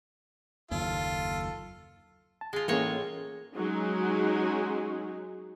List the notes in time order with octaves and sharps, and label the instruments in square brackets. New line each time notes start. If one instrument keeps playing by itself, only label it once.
[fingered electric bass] F#1 D#2 [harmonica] F4 A4
[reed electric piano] A5
[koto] G#3 F4
[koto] A2 G#3 C#5 [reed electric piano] E3 A#3 C#4
[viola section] F#3 G#3 C#4 D#4 F#4 G#4